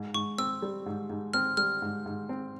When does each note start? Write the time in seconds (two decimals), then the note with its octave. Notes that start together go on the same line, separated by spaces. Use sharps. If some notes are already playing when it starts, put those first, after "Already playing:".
Already playing: G#2
0.14 G#2 C#6
0.38 C4 E6
0.62 G3
0.86 G#2
1.10 G#2
1.34 C4 F6
1.57 G3 F6
1.82 G#2
2.06 G#2
2.29 C4